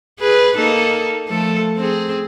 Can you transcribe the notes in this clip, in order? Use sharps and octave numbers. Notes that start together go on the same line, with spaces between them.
G#4 B4
A#3 D#4 A4
F3 A3 A4
C4 G#4